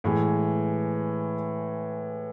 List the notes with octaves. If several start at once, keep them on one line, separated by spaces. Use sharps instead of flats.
A2 E3 G#3